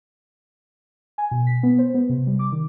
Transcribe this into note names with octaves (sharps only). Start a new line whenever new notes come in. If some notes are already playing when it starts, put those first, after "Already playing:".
G#5
B2
B6
B3
C5
B3
C3
G3
D6
D#3